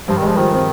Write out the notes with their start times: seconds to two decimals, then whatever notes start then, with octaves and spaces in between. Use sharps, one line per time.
0.08 G2 F3
0.18 D#3
0.22 G#3
0.27 F3
0.37 D#3 F3
0.52 C4